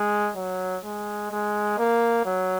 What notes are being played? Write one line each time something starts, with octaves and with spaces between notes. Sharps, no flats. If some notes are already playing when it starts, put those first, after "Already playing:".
Already playing: G#3
F#3
G#3
G#3
A#3
F#3